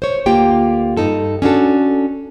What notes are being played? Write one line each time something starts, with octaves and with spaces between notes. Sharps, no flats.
C5 C#5
D2 A#3 F4 G4 G5
G2 D#4 A4
C#4 D4 F#4 A4